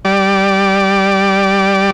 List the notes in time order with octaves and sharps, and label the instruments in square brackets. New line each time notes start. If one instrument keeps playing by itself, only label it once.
[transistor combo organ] G3 D5